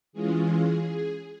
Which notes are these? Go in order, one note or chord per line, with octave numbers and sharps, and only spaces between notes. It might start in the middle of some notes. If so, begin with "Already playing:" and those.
E3 G#3 C#4 F4 G#4